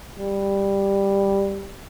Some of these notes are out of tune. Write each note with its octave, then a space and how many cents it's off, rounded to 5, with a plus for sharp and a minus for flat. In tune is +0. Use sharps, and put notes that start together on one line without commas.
G3 +10